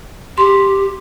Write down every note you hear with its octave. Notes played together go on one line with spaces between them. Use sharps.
G4 C6